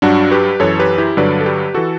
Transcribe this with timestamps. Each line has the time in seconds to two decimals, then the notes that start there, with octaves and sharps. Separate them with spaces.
0.02 G2 F#3 D4 F#4
0.31 G4 B4
0.60 F#2 E3 A4 C#5
0.79 G4 B4
0.98 E4 G4
1.17 G2 D3 F#3 B4 D5
1.41 A4
1.46 G4 B4
1.74 E3 F#4 A4